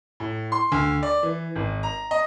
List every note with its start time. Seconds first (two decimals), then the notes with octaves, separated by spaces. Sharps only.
0.20 A2
0.52 C6
0.72 D2
1.03 D5
1.23 E3
1.56 G#1
1.83 A#5
2.11 D#5